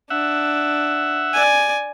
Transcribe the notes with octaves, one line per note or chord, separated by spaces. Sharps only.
D4 E5 F#5
D5 G#5